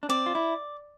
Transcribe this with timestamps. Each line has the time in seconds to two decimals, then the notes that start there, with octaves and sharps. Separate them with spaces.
0.03 D4
0.09 C4 D5
0.26 F4
0.35 E4